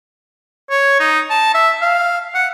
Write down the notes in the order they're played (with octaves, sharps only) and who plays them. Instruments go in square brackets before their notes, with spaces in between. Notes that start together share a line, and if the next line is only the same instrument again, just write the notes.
[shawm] C#5
D#4
A5
E5
F5
F#5